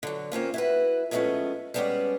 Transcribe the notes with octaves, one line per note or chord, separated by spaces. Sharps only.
D3 F#3
A#3 C4 C#4 F4
E4 F#4 B4
A2 F3 G#3 A3 B3 C#4
G3 G#3 A#3 B3 C#4 D5